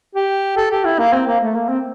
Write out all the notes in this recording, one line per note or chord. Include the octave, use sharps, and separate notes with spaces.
G4
A4
G4
E4
A#3
C4
A#3
A3
A#3
C4